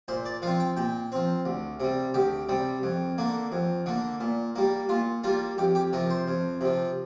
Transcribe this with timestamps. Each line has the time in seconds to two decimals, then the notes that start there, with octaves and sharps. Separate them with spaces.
0.08 A#2 C5
0.25 D5
0.42 F3 F5
0.47 C4
0.60 G5
0.77 A#2 G5
1.12 F3 C4
1.45 D2
1.80 C3 G3
2.14 D2 G4
2.49 C3 G3
2.83 F2
3.18 D3 A#3
3.52 F2
3.86 D3 A#3
4.20 A#2
4.56 G3 A#3
4.89 A#2 F4
5.24 G3 A#3 F4
5.58 F2 G4
5.75 G4
5.93 C3 F3 A#4
6.10 C5
6.28 F2
6.61 C3 F3